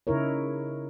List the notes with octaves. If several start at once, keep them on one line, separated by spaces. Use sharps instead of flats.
C#3 D#4 E4 A#4 C#5